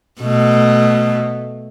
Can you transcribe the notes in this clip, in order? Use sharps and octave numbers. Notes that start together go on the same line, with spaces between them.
B2 A3